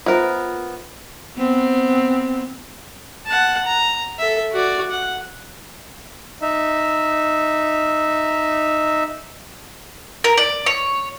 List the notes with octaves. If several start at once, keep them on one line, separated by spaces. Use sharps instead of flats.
B3 F4 A#4 C5 E5
B3 C4
F#5 A5
A#5
A4 E5
F#4 D5
F#5
D#4 E5
A#4
D5
C#5